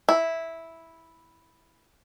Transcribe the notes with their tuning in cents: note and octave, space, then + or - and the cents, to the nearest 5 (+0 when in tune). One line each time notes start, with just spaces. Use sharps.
E4 -5